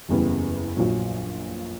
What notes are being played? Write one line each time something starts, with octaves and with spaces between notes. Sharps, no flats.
F#1 E2 C#3 G3 B3
A#1 A#2 F#3